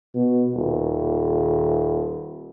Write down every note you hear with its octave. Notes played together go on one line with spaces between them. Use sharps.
B2
D#1